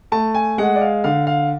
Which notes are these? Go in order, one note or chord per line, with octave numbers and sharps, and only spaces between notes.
A3 A5
G#5
G#3 F#5
D5
F5
D3 F5
F5